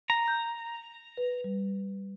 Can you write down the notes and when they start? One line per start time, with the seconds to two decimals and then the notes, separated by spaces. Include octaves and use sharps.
0.10 A#5
0.28 G6
1.17 B4
1.44 G3